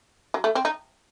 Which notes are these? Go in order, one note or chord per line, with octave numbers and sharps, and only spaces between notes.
F#3
A3
C4
D#4